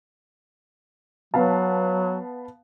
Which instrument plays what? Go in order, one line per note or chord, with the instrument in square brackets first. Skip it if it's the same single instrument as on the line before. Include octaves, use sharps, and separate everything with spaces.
[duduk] F#3 [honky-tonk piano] B3 F5 A5